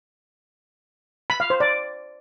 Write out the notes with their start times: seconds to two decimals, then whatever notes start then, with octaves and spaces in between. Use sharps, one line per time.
1.30 B5
1.40 F5
1.50 C5
1.60 D5